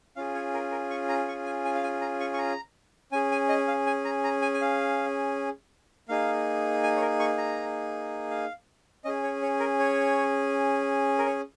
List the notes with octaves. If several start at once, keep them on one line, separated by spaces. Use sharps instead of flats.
C#4 F4 G#4 F5
C#5
A#4
A#4
C#6
A#5
C#6
G#5
G#5
F5
G#5
A#5
C#6
C#6
A#5
C#4 G#4 G#5
G#5
D#5
F5
G#5
A#5
A#5
G#5
G#5
F5
A#3 D#4 G#4 F5
G#5
C#5
A#4
C#6
A#5
F5
C#4 G#4 D#5
C#5
C#5
A#4
C#5
A#4
C#5